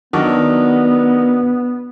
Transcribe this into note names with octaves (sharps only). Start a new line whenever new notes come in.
D#3 F#3 B3 D4 F#4 D5